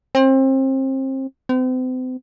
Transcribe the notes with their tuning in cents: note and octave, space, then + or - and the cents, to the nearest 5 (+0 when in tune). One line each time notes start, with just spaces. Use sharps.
C4 +30
C4 -40